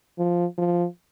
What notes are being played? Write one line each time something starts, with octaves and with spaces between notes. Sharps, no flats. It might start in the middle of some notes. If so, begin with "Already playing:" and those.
F3
F3